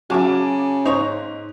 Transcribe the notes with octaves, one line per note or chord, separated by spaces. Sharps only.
C#3 F#3 E5 F5 G#5 A5 D6
G#2 D#4 C5 C#5 F7